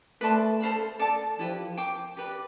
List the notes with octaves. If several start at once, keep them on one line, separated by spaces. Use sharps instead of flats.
A3 B4 D5 A5 C6
A4 C5 F5 B5
A4 D5 A5
F3 E4 G4 B4
C5 G5 D6
G4 B4 D5